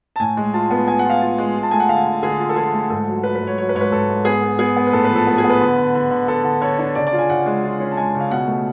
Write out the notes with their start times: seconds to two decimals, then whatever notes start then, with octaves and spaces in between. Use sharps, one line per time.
0.16 A5
0.20 A2 G#5
0.37 G#3
0.54 F4 A5
0.70 B3
0.88 B3 G#5
0.99 F#5
1.05 F4 F5
1.21 F4
1.38 G#3
1.55 F4
1.63 A5
1.71 A3 G#5
1.80 F#5
1.89 D3 F5
2.06 D3
2.23 D3 G#4
2.39 F4
2.49 A4
2.56 F3 G#4
2.74 A3
2.90 G#2 A4
3.08 F#3
3.23 F#3 B4
3.35 B4
3.41 G#2
3.47 C#5
3.58 F#3 C#5
3.69 B4
3.75 G#2 C#5
3.81 B4
3.92 G#2 A4
4.09 G#2
4.25 B3 G#4
4.42 B3
4.59 B3 G#4
4.76 B3
4.87 B4
4.93 A2 A4
5.05 B4
5.10 F3
5.16 A4
5.27 B3
5.38 G#4
5.44 B3
5.50 B4
5.61 D3
5.78 D3
5.95 D3
6.11 D3
6.28 D3 A4
6.44 D3
6.61 D3 C#5
6.79 D4
6.95 C#3 D5
7.07 D5
7.13 F4
7.19 G#5
7.29 C#3 F#5
7.46 G#3
7.64 F4
7.80 C#4
7.91 A5
7.97 G#3 G#5
8.15 C#3
8.20 F5
8.31 B2 F#5
8.47 A3